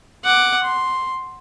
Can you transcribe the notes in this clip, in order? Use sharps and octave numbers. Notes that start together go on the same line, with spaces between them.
F#5 D6
C6